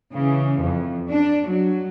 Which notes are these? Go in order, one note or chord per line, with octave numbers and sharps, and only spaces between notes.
C#3 E3
F2
D4
F#3